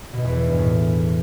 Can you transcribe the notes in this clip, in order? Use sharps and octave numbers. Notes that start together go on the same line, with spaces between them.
B2
E2
E3
G2
A2